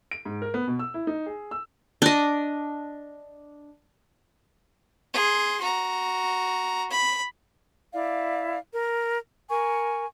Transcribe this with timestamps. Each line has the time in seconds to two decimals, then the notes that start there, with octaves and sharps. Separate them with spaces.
0.11 D7
0.25 G#2
0.42 A#4
0.54 B3
0.67 B2
0.79 E6
0.94 E4
1.07 D#4
1.26 G#4
1.51 E6
2.02 D4 D#5
5.14 G#4 C6
5.61 F#4 A#5
6.90 B5
7.94 E4 D5 F5
8.74 A#4
9.49 A#4 G#5 C#6